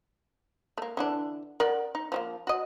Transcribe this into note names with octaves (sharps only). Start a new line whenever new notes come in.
A3 A#3
D3 E3 D4
A#4 D5 F#5
D#4
F3 F#3 A#3
F#4 D#5